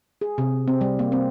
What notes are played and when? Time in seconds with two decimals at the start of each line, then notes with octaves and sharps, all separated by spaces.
0.21 G#4
0.38 C3
0.68 C4
0.81 G3
0.99 A#3
1.12 C4